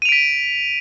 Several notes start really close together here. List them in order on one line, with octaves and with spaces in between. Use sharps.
D#7 F7 D7 B6